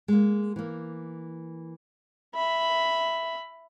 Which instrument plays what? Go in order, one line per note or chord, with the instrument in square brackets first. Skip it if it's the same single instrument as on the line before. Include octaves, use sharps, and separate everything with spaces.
[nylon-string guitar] G#3 A#3
E3 A#3
[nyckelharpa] E5 B5